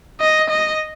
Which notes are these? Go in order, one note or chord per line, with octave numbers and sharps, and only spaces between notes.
D#5
D#5